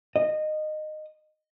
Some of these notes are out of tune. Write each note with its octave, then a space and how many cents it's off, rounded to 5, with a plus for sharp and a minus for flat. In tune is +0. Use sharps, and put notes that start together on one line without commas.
D#5 -15